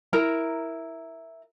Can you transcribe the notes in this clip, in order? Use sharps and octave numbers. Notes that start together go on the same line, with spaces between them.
E4 A#4 A#5